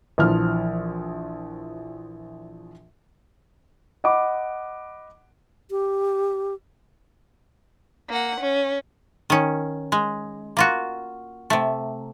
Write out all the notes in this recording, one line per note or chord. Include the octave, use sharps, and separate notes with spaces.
A#1 E3 F3 F6
D#5 F#5 B5 D6
G4
A#3 F#5
C#4
D#3 C#4
G#3
A#3 F4 F#4
C3 A3